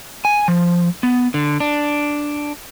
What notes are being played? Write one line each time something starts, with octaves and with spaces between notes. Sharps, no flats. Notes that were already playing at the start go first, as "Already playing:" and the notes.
G#5
F3
B3
D3
D4